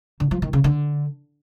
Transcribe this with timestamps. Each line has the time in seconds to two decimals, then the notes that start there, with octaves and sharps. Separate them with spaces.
0.20 D3
0.31 F3
0.42 D#3
0.53 C#3
0.64 D3